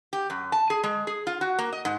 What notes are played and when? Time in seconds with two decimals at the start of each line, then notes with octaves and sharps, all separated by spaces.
0.13 G4
0.30 F#2
0.52 A5
0.70 G#4
0.84 G#3
1.07 G#4
1.27 F4
1.41 F#4
1.59 A#3
1.73 D#5
1.85 G#2